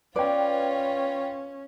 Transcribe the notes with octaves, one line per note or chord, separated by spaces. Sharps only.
C#4 F4 B4 C#5 D5 G5